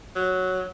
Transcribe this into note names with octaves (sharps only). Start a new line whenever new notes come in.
F#3